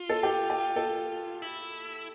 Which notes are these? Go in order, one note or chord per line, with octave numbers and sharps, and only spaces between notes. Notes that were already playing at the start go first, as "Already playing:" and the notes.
Already playing: F4
A4
G4
G4
A4
E4